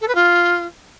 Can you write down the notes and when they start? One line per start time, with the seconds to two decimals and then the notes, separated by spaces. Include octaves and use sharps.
0.01 A4
0.08 B4
0.15 F4